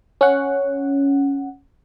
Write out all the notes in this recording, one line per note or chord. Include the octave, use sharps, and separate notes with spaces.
C#4 F#5